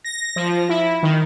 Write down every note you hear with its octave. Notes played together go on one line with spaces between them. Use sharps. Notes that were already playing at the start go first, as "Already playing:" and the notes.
A#6
F3
E4
D#3